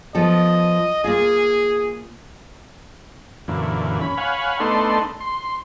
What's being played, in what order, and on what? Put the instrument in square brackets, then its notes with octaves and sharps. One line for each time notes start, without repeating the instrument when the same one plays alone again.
[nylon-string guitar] F3 B3 A4 [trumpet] D#5
[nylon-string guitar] A#3 F4 [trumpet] G#4
[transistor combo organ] F#2 A#2 D3 E3
C#4 B5
C#5 F5 F#5 G#5 B5
A3 B3 D4 D#4 A4 C6
C6